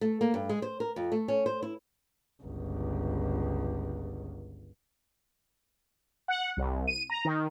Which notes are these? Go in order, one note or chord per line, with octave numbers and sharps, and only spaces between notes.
A3
A#3
G2
G#3
C5
A#4
F2
A3
C#4
C5
E4
G1 C#2
F#5
C2
D#7
A#5
D#3